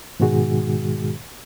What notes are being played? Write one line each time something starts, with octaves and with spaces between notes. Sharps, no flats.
G#2 B2 D#3 G#3 F#4 G#4